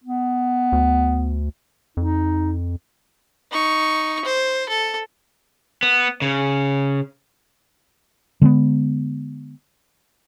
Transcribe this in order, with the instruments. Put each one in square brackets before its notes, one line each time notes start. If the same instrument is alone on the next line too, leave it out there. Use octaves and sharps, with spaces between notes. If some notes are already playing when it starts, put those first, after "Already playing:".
[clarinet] B3
[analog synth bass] D2
[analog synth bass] F2 [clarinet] D#4
[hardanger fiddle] D#4 C#6
C5
A4
[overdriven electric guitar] B3
C#3
[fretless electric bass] D3 G#3 A3 B3